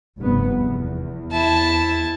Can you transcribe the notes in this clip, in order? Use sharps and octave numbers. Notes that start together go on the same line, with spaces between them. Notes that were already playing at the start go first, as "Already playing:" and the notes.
F1 G2 B3
E2
E4 A5